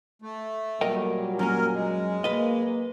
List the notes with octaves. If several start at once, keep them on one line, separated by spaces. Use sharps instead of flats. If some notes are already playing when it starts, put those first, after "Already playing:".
A3
A#2 F#3 G3 A#4 D#5 G5
F#2 A#3 C#4 A#4
G#3
A#3 B4 D#5